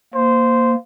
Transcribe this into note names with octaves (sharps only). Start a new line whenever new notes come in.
A#3 C5